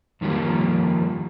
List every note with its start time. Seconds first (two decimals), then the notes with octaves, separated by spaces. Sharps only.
0.21 F2 D#3 F3 G3 A#3